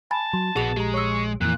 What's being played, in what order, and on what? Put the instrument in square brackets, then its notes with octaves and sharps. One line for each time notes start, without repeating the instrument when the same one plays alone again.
[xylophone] G#5 B5 A6 [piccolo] A5
[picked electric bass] F#3 [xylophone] C6
[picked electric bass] A#1 [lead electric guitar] B3 F#4 [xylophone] G#4 F7
[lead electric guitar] G#3 [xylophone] G4 A#5
[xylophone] C#5 E6 [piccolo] C#6
[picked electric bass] F2 E3 [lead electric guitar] A#2 [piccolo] F#6